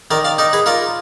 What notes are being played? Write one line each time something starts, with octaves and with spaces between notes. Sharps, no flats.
D#3 A#4 D5
D5 F5
D#4 A#4 D5
G#4 B4
F4 A#4 D5